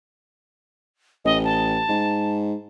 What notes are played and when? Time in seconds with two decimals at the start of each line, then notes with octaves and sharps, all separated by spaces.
1.25 A1 D#5
1.44 A5
1.89 G#2